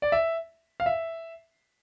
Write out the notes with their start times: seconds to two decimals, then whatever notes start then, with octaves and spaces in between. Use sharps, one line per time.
0.02 D5
0.12 E5
0.80 F5
0.86 E5